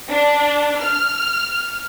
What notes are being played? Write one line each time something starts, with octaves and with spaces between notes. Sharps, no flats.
D4
F6